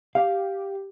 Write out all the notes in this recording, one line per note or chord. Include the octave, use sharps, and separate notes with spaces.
G4 F5